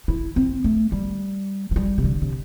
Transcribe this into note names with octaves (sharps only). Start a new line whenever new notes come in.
E4
C4
A3
G3
F3
G3
C3
D3
C3